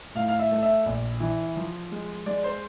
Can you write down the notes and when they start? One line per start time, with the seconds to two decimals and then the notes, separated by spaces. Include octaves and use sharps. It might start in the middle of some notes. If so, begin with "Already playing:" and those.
0.15 A2 F5
0.28 F5
0.39 E5
0.51 A3
0.63 E5
0.86 A#1
1.20 E3
1.56 F3
1.92 G#3
2.26 G#3 D5
2.44 C5